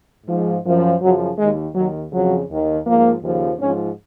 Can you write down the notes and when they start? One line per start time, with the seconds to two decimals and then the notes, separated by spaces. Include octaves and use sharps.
0.26 G#2 F3
0.64 F#2 F3
1.00 F#2 C#3 F3 F#3
1.38 D#2 D#3 G#3
1.74 D#2 D#3 F#3
2.11 F2 C#3 F3 F#3
2.49 D#2 D#3
2.86 G#2 F3 A#3
3.22 D#2 C#3 F3
3.59 G#2 F3 C#4